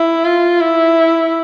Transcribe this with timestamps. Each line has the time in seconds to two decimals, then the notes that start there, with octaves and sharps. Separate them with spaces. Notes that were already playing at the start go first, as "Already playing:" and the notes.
Already playing: E4
0.25 F4
0.61 E4